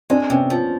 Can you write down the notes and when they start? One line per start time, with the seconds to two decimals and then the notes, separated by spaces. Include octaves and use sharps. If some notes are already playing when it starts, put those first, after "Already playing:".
0.10 G#3 C4 D4
0.30 C3 B3 C#4
0.50 F3